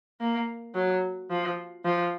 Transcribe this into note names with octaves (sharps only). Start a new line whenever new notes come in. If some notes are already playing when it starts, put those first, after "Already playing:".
A#3
F#3
F3
F3